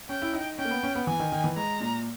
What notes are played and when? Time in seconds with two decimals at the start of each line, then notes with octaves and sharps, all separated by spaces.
0.09 C#4 G5
0.22 E4
0.33 D#4
0.58 C#4 G5
0.65 A#3
0.71 B3
0.83 C#4
0.95 B3
1.07 E3 G#5
1.19 D#3
1.32 D#3
1.44 E3
1.56 G#3 A#5
1.80 A#2